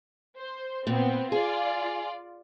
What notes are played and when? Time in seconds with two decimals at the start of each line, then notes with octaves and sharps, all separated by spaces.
0.36 C5
0.87 A#2 B3 C4
1.32 F4 G#4 D5